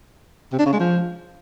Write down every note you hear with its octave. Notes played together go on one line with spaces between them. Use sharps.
C3
D4
C#3
G#3
F3